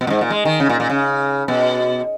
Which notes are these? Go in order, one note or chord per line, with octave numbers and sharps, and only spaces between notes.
B2
A#2
G#2
A#2
G#3
D#3
C#3
A#2
A#2
C#3
B2